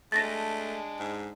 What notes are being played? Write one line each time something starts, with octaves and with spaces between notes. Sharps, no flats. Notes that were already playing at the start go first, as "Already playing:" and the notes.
G#3 A3 D4 A6 A#6
G#2